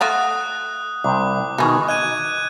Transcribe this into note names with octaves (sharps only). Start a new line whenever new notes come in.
A3 F4 F#4 D#6 F#6
C2 G5 D6
B2 D#3 D#4 G#4
D#5 F#6 G#6 D#7